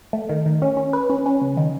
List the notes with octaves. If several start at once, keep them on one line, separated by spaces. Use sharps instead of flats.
A3
D#3
D#3
C#4
C#4
B4
C#4
C#4
C#3
D#3